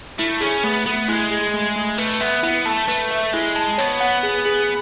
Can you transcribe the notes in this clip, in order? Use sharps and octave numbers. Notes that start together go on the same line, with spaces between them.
A3 E4
C#4 G#4
A3 B3
A3 B3
G#3 E4
G#4
A3
A3
A3 B4
B3 E5
B3 E4
A3 A5
A3 B4
E5
G#3 E4
A5
B3 C#5
F#5
G#4
G#4